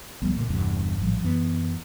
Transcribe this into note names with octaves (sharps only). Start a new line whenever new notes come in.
C#2 F3 G3 B3
D2 A#2 A#3
G1 E2 G2 C3
A#1 A2 F3 G3
F#2 E3 A#3 B3